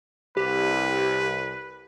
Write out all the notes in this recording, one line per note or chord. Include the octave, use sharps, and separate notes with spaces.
C2 G4 B4